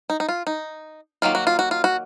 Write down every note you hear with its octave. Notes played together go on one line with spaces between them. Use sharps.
D#4
D#4
F4
D#4
D#3 F#3 A#3 F4
F#4
F4
F#4
F4
F#4